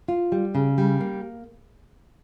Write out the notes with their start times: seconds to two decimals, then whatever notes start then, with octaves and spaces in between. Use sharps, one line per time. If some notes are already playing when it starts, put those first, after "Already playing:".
0.08 F4
0.32 G3
0.55 C#3
0.78 G3
1.01 A#3